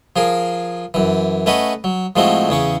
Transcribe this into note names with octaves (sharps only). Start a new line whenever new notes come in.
F3 G#4 A#4
F#2 E3
A3 C#4 B4 D#5 F#5
F#3
A2 F3 G#3 A3 C4 F#4
E2 C#3 C#4 C#6